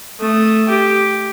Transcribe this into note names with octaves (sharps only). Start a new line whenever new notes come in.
A3 D#6
G4